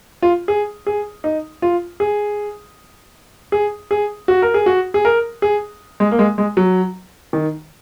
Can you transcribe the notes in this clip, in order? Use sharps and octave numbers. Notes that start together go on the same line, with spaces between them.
F4
G#4
G#4
D#4
F4
G#4
G#4
G#4
F#4
A#4
G#4
F#4
G#4
A#4
G#4
G#3
A#3
G#3
G#3
F#3
D#3